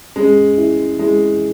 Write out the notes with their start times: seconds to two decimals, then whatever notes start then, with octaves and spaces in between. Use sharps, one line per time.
0.16 G#3 C#4
0.58 E4
0.99 G#3 E4